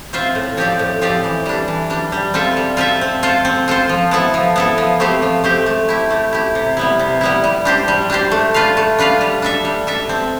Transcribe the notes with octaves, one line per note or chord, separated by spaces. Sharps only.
C4 F4 C5 E5
A2
F3 C4 G4 D5
A2
F3 C4 G4 D5
E3
G3 D4
E3
G3 D4
G3
C4 F4 A4 E5
G3
C4 F4 A4 E5
C4
F4 A4 C5
C4
F4 A4 C5
F3
B3 E4 A4
F3
B3 E4 A4
F3
A3 C4 G4 C5
F3
A3 C4 G4 C5
A3
E4 G4
A3
E4 G4
C3
G3 B3 E4
C3
G3 B3 E4
G3
D4 G4 C5
G3
D4 G4 C5
A3
D4 F4 B4 F5
A3
D4 F4 B4 F5
G3
D4 A4 E5
G3
D4 A4 E5
C4